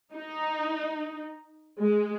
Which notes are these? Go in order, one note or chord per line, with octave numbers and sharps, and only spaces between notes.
D#4
G#3